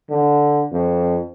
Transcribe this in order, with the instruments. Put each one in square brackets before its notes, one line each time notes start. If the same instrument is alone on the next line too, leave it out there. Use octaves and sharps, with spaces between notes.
[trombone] D3
F2